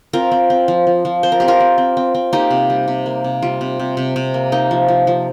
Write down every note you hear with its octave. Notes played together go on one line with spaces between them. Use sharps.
C4 F4 A#4
C4
C4
F3
F3
F3
C4 C5
A#4
C4 G4
F4 A#4
C4
C4
C4
C4
A#3 D#4 G4
C3
G3
C3
A#3
C3
G3 F4
C3
C3
C3
C3
A#3
A#3 D#4
F3
F3
F3